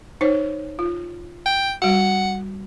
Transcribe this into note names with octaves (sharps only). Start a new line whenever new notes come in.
D#4 C5 C#5
F4
G5
G3 F#4 F#5